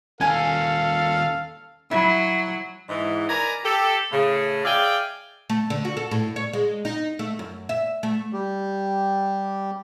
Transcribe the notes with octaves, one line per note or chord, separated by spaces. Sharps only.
D#2 C#4 A4 F5 G#5
F#3 E4
G#2 E3
A#4 B4 D5 G#5 A#5
G4 A4
A2 C#3
G#4 D5 E5 F5 G5 G#5
A3
D3
F#4
A4
A2
C#5
G#3
D#4
A3
F#2
E5
A3
G3 G4